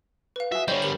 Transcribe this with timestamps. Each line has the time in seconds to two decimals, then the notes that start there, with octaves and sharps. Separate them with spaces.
0.36 B4 F5
0.52 F#4 G#4 E5
0.68 D3 G3 C5 C#5 D#5 G6
0.82 G4 A#4 F#7